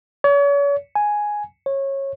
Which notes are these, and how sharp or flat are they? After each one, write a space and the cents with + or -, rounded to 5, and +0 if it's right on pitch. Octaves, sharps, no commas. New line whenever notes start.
C#5 +40
G#5 +5
C#5 -20